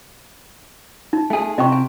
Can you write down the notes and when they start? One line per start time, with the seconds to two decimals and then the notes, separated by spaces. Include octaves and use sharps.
1.13 D#4
1.30 A3 G#4 G#5 A5
1.58 C3 D#5 G5 C#6
1.72 G#5